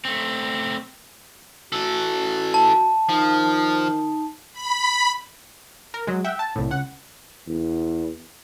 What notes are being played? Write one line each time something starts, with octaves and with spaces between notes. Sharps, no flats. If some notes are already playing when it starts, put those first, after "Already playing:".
A3 C4
E3 F#4 A4
A5
D#3 F3 D#4
B5
A#4
F#3 G#3
E5 F#5 G5
A5
C2 A2
C#2 F#5
E2